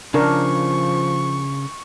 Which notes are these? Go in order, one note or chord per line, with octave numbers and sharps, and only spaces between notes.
C#3 F3 D4 A#4 C#6